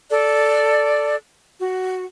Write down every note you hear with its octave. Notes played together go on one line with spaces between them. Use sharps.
A4 D5
F#4